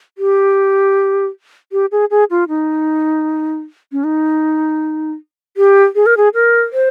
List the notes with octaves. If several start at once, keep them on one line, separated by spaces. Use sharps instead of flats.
G4
G4
G#4
G#4
F4
D#4
C#4
D#4
G4
G#4
A#4
G#4
A#4
C5